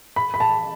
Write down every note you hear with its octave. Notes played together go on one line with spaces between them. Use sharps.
B5
B5
A5